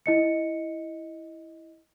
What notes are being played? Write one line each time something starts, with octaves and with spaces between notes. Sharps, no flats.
E4 D#5 C#7